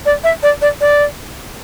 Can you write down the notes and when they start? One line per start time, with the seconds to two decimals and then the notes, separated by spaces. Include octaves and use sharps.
0.06 D5
0.24 E5
0.43 D5
0.62 D5
0.81 D5